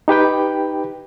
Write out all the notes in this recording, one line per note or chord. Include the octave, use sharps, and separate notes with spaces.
D#4 G4 B4 G5